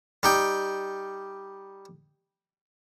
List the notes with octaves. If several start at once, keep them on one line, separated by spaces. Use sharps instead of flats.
G3 D#4 G5